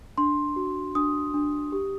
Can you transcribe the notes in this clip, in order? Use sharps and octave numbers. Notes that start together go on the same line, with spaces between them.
D4 C6
F#4
D4 D#6
D4
G4